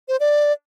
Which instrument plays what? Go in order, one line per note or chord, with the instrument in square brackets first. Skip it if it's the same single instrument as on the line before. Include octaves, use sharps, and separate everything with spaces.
[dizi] C5
D5